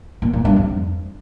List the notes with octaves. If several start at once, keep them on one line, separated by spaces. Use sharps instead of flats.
A#2
A#2
G2
F2